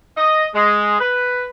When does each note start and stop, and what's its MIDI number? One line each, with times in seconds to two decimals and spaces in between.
0.17 0.47 75
0.55 0.98 56
1.00 1.47 71